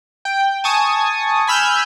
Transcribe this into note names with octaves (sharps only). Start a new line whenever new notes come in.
G5
G#5 A5 C#6 D#6
G#5 B5 E6 F6 G6